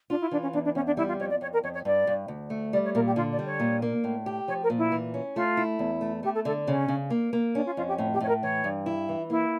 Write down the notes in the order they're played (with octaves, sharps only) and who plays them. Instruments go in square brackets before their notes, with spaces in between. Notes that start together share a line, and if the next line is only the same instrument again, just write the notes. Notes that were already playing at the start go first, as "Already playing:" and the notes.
[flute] D4 [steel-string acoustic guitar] F4
[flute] E4
[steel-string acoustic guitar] E3 [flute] D4
[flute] C#4
[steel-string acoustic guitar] E2 [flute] D4
[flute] D4
[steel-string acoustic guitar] E2 [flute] C#4
[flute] D4
[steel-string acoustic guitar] G3 [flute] E4
[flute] F4
[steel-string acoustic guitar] F2 [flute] C#5
[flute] D5
[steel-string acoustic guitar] F2 [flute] C#5
[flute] A#4
[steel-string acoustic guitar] F2 [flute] C#5
[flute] C#5
[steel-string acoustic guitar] G2 [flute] D5
[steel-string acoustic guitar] G2
D2
A3
[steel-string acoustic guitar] G3 [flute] D5
[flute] C#5
[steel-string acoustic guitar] A#2 [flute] A#4
[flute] G4
[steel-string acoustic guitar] D3 [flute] F4
[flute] D5
[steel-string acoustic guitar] G3
[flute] C#5
[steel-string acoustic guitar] A#2
A#3
A2
G4
[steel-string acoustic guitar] F3 [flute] C#5
[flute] A#4
[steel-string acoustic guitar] A#2
[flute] E4
[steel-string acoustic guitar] E3
C#4
[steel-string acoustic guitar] A3 [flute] F4
[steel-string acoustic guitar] E4
E2
A3
[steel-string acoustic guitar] A3 [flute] G4
[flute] A4
[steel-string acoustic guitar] D3 [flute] A4
[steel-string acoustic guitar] C#3 [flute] C#4
[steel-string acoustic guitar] C#3
A#3
A#3
[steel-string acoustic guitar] C#4 [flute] D4
[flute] F4
[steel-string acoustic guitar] F2 [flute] F4
[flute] G4
[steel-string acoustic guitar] A2
[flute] G4
[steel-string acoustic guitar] A2 [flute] C#5
[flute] A#4
[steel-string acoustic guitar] E3 [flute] C#5
[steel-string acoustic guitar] G2
E4
E3
[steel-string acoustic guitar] A#3 [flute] E4